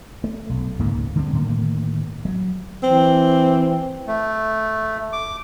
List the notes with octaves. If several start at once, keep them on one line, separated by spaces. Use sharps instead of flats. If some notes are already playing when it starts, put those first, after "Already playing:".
A3
B1
C#2 G#2 D3 A#3
D3 G3 A#3 C4
A2 D3 D#3 A#3
F#3
E3 C4
A3
D6